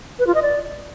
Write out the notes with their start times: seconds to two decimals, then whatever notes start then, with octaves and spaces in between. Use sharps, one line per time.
0.19 B4
0.27 F4
0.35 D#5
0.42 D5